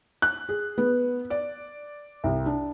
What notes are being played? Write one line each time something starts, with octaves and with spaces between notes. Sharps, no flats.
F#6
G#4
B3
D5
C2
D4